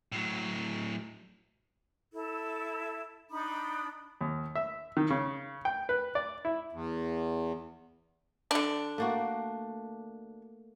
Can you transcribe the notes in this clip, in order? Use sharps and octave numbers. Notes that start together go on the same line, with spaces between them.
A2 F#3
E4 A4
D4 D#4 B5 D#6
D#2
E5
D#3
C#3
G5
B4
D5
E4
E2
D3 D4
A3 A#3 F#4